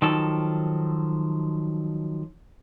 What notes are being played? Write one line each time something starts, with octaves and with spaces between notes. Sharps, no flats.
D#3 F3 F#3 A4